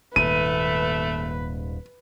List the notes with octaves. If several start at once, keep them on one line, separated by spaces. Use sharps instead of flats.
D#1 D#2 G#2 A3 B4 D#7